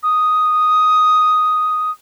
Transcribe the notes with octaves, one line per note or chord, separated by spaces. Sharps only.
D#6